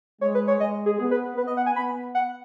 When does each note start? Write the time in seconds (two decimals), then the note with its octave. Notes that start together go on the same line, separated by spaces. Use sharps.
0.21 G#3 C#5
0.35 B4
0.48 C#5
0.60 G#3 D#5
0.86 G#4
0.99 B3 G#4
1.11 B4
1.37 B3 B4
1.47 D#5
1.57 F#5
1.66 G#5
1.76 B3 B5
2.15 F#5